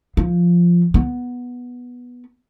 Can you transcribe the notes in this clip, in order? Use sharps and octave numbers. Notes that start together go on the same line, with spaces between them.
F3
B3